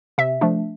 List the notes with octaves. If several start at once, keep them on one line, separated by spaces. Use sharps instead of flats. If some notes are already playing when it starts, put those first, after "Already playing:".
C3 E5
F3 A3 D4